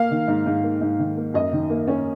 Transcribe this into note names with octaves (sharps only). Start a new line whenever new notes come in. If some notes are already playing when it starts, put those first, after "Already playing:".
Already playing: A#3 F5
D#3
G#2
G#2
A#3
G#2
D#3
A#3
F#2 D#5
D#3
A#3
C#4